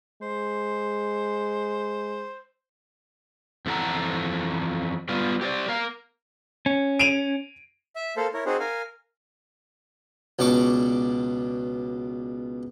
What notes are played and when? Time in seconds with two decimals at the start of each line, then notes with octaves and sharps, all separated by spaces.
0.22 G#3 C5
3.66 F2 E3 A4 F#5 A#5
5.09 G3 B3 F4
5.41 G4 C5 D5
5.69 A#4 F5
6.66 C#4
6.99 D7 D#7 F7
7.96 E5
8.17 A#3 A4 C5 F5
8.34 E4 A#4 C#5
8.46 C4 D#4 F#4 G#4 C5
8.60 A#4 F5 G#5
10.39 C#2 B2 D4 D5 C#6 D6